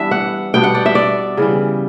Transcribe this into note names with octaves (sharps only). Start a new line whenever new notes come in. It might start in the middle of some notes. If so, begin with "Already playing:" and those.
Already playing: E3 G3 B3 D4 E5
F#5
B2 G3 B3 D4 G5
F#5
D5
E5
D5
C#3 E3 G3